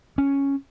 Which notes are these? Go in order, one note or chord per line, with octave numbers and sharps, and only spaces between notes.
C#4